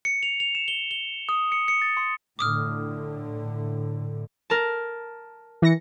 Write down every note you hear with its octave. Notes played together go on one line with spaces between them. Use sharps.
C#7
F7
F7
E7
G7
G7
D#6
C#7
C#7
A6
C6
A2 D3 D6 D#6 F6
A#4 A5
E3 A#6 C#7